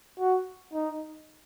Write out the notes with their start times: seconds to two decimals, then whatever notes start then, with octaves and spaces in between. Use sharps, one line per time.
0.19 F#4
0.74 D#4